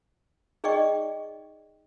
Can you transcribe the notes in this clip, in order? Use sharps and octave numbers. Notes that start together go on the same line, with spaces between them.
D#4 G#4 D5 D#5 G5 C#6